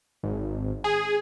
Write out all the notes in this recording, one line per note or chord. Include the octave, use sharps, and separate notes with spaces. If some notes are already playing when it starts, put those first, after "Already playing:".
G#1
G#4